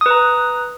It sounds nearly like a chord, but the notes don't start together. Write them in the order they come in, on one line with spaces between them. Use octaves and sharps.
D#6 B4 A#5